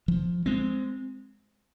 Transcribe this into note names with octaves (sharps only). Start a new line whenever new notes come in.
F3
G#3 C4